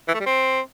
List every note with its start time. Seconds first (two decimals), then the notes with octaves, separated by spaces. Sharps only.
0.08 E3
0.14 A3
0.20 G3
0.26 C4